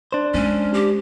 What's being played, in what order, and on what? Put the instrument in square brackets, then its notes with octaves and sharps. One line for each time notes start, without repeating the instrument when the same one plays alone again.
[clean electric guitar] D4 C5
[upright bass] G#3 [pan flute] C#4
[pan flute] G4